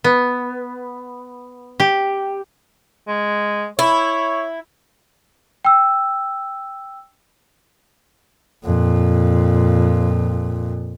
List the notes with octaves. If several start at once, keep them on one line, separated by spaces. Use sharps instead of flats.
B3
G4
G#3
E4 C#5
G5 E6
F2 A#2